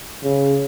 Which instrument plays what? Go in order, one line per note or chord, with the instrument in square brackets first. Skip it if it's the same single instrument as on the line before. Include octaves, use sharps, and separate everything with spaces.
[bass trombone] C#3